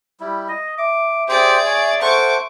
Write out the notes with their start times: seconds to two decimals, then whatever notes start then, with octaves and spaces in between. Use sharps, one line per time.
0.20 G3 E4
0.49 D#5
0.78 E5 D6
1.28 G4 G#4 C5 D5
1.66 C#5 G#5
2.01 A4 C5 F#5 C#6 D6